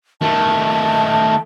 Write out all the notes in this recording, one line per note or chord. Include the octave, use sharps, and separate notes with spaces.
D#3 A3 A5